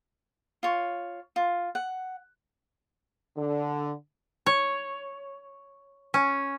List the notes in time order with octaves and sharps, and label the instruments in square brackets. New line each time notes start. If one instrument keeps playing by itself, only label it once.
[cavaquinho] F4 C#5
F4
F#5
[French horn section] D3
[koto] C#5
C#4